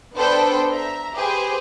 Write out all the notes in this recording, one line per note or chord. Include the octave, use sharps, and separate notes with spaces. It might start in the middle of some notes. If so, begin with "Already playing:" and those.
B3 D4 A4 B4 C5 G5
E5 A#5
G4 G#4 B4 C5